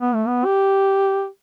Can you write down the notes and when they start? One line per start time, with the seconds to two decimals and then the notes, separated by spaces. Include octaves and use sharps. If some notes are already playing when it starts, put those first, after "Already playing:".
0.01 B3
0.14 A3
0.28 B3
0.45 G4